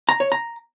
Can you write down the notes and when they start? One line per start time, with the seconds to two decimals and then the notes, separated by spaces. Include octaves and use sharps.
0.09 A#5
0.20 C#5
0.32 A#5